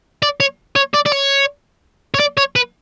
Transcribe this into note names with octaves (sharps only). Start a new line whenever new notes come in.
D5
C#5
C#5
D5
D5
C#5
C#5
D5
C#5
B4